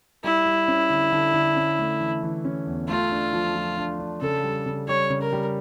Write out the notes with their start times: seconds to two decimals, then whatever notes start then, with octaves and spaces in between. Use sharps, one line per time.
0.24 G3 E4
0.46 G3
0.68 C#4
0.90 D3
1.12 D3
1.34 D3
1.56 C#4
1.79 A3
2.01 E3
2.23 E3
2.45 C#4
2.67 E2
2.89 A3 F4
3.12 D4
3.33 F3
3.55 F3
3.77 D4
3.99 D4
4.21 C#3 A4
4.44 G3
4.66 C#3
4.88 G3 C#5
5.10 C#3
5.21 A#4
5.33 G3